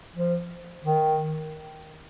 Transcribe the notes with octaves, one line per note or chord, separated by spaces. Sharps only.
F3
D#3